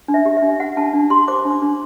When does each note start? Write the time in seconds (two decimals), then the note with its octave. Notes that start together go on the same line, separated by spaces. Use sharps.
0.08 D4
0.14 E5
0.26 G4
0.37 E5
0.42 D4
0.60 G4 F#5
0.77 D4 A5
0.93 D4
1.10 G4 C6
1.28 C5 D6
1.45 D4
1.51 D6
1.62 D4